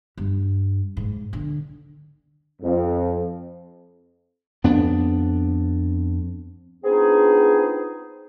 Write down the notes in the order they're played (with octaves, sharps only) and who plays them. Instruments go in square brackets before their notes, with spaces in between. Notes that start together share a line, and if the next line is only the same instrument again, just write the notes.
[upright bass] G2
G#2
D3
[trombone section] F2
[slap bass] F2 B3 C4 D4
[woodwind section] B3 C4 D4 D#4 F4 G#4